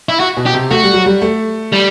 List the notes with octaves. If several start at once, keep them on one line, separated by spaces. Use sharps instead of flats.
E4
F#4
B2
G4
C3
A3 F#4
G3
F#3
G3
A3
G3